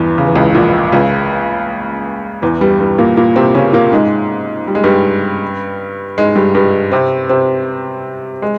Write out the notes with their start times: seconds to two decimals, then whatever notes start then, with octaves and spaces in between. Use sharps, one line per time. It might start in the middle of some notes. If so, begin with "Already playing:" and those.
Already playing: E2 G2 E3
0.18 C#3
0.27 E3
0.36 C#2 C#3
0.55 A#1 A#2
0.92 C#2 C#3
2.42 E2 E3
2.61 G2 G3
2.80 G2 G3
2.98 A#2 A#3
3.17 A#2 A#3
3.36 C3 C4
3.54 C#3 C#4
3.73 A#2 A#3
3.92 G#2 G#3
4.67 G3
4.75 G#3
4.84 G2 G3
6.18 G#2 G#3
6.35 G2 G3
6.55 G2 G3
6.92 C3 C4
7.29 C3 C4
8.42 G#3